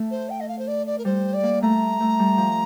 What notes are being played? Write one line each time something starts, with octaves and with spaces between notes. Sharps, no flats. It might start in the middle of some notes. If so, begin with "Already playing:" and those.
Already playing: A3
C5
G5
D#5
F5
C5
D5
D5
A#4
G3 C5
D5
A#3
A3 A#5
A3
G3
F3